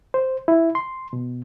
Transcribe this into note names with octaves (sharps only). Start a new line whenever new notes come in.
C5
E4
C6
B2